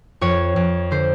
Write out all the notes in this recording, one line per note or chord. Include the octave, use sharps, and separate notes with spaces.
F2 C#5
F2
D3 C5